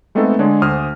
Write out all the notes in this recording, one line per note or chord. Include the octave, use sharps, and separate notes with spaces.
G#3 A3 B3 C4 D#4 A4
D3 G#3 D4 G#4 C#5
D2 C5 D#6 F6